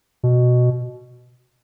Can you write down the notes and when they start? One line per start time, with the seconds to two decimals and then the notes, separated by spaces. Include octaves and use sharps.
0.23 B2